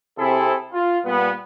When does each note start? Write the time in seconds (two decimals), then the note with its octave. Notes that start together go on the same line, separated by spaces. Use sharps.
0.17 C3 C4 E4 G#4 A4
0.72 F4
1.04 A#2 G3 B3